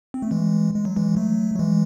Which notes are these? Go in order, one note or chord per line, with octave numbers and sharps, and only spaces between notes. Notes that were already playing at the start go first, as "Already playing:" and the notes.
C4
A3
E3 G#3
G#3
F#3
E3 G#3
F#3 A3
F#3
E3 G#3